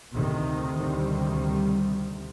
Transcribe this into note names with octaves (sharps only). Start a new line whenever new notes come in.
D2 C3 D#3
D#3 G3